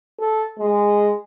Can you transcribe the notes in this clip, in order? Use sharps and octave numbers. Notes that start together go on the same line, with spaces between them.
A4
G#3